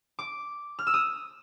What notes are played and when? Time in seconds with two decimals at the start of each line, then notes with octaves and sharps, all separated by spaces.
0.19 D6
0.79 F6
0.87 E6
0.94 D#6